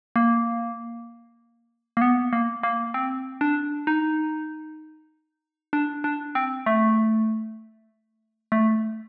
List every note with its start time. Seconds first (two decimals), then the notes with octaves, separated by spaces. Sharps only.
0.16 A#3
1.97 A#3
2.01 B3
2.33 A#3
2.63 A#3
2.94 C4
3.41 D4
3.87 D#4
5.73 D4
6.04 D4
6.35 C4
6.66 A3
8.52 A3